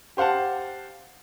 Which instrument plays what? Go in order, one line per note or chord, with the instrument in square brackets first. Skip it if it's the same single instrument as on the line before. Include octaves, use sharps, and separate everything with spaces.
[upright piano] G4 C5 F5 F#5 A5